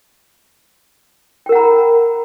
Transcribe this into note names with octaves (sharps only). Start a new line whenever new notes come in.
A#4 F#5 G5 A#5 B5